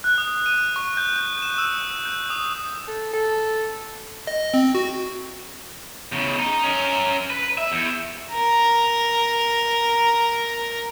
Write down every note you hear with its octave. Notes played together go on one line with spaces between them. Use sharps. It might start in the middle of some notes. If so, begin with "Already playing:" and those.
F#6
D#6
D#7
C#6
G6
E7
E6
G6
D#6
A4
A4
D#5
C4
F#4
E2 C#3
D#4
C#4 A#4
B4
E5
E2
A#4 A#5